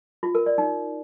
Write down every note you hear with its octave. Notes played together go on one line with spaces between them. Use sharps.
F4
A#4
D5
D#4